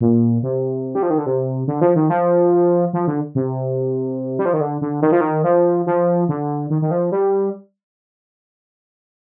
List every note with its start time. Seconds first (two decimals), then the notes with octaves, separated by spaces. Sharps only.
0.01 A#2
0.43 C3
0.95 G3
1.03 F3
1.10 D#3
1.18 D3
1.26 C3
1.67 D3
1.81 F3
1.96 D#3
2.10 F3
2.93 F3
3.07 D3
3.35 C3
4.39 G3
4.45 F3
4.53 D#3
4.61 D3
4.81 D3
5.02 D#3
5.12 F3
5.21 D#3
5.44 F3
5.86 F3
6.29 D3
6.70 D#3
6.82 D#3
6.91 F3
7.12 G3